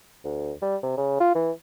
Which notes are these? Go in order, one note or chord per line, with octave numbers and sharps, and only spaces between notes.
D2
G3
C3
C#3
F4
E3